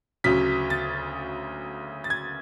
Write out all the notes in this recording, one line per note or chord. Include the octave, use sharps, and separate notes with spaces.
D2 C#3 F#3 B6
A6
A6
G#6